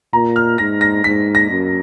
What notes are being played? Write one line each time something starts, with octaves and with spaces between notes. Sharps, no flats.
A#2 A#5
F6
G#2 A#6
A#6
G#2 B6
A#6
F#2